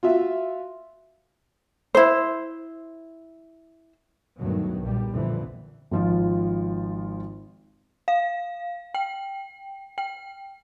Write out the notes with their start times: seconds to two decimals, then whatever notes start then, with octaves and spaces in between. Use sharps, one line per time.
0.03 F4 F#4 E5
1.95 E4 C5
4.39 D2 G2 B2 D#3 F#3
4.81 B1 A#2 G3
5.10 F2 A#2 D3 E3
5.91 G#1 F3 F4
8.08 F5
8.94 G5
9.98 G5